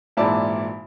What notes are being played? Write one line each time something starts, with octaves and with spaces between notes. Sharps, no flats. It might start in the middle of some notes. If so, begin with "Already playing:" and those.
G#1 A#2 E3 E4 D5 A5